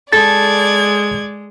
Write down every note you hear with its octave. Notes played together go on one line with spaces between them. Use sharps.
G#3 A4 D5 G#6 A6